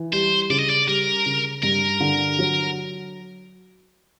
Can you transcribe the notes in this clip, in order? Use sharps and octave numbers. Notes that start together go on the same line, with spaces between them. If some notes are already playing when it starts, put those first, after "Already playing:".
Already playing: E3
G3 C5
C#3 D5
D#5
D5
G3 A#4
C#3
G2 A#4
D3
F#3